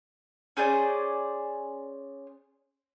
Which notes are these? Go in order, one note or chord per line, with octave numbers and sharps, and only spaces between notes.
C#4 G#4 C5 D5